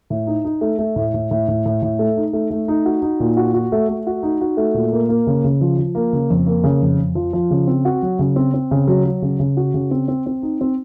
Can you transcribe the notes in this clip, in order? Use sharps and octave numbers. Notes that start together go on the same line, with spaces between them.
A2
D#4
D#4
A3
A3
A2
A2
A2
A2
A2
A2
A3
D#4
A3
A3
D#4
F#4
D#4
A#2
F#4
F#4
A3
A3
F#4
D#4
F#4
A3
A#2
A#3
A#3
C#3
C#3
F3
F3
A#3
C#3
F2
A#3
C#3
F2
F2
F3
F3
C#3
C4
F#4
F#3
C#3
C4
C4
C#3
F#3
F#3
C#3
C#3
F#4
C#3
C4
C4
C4
D#4
C4